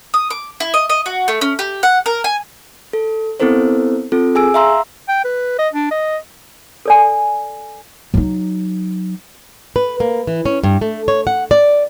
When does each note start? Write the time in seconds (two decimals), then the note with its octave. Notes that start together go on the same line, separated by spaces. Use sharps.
0.14 D#6
0.30 D6
0.60 E4
0.74 D#5
0.90 D#5
1.06 F#4
1.28 A3
1.41 C#4
1.59 G4
1.83 F#5
2.06 A#4
2.24 G#5
2.93 A4
3.40 B3 C4 E4 A4 A#4 C5
4.12 C4 F4 A4
4.35 G#4 G#5 E6 D7
4.54 E5 F5 A#5 C6 E6
5.09 G5
5.25 B4
5.59 D#5
5.74 D4
5.91 D#5
6.86 A4 D5 G#5
8.14 F#3 D#4
9.76 B4
10.00 A#3
10.27 E3
10.46 C#4
10.63 G2
10.81 A3
11.08 C#5
11.27 F#5
11.51 D5